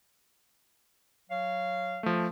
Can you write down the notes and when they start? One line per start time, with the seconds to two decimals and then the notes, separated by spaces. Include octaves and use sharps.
1.30 F#3 C#5 F5
2.03 F3 A3